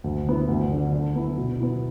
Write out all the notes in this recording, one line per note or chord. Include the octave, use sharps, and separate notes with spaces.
D2
D3 B3 E4
D2
D3 A3 D4
D3
B3 E4
B2
B3 E4